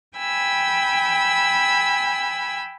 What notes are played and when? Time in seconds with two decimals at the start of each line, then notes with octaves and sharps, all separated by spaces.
0.17 G5 G#5 B5 E6